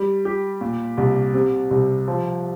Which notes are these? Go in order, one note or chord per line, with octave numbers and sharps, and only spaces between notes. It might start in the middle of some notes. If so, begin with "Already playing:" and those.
Already playing: G3
G4
A#2
C2
C3
C2
F3